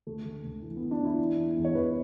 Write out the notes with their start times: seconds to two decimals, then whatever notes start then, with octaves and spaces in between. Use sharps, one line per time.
0.07 D2 A3
0.26 D2
0.45 D2
0.62 E3
0.76 B3
0.82 E3
0.91 D4
1.00 E3 E4
1.18 E3
1.37 E2
1.57 E2
1.65 C#5
1.75 E2 B4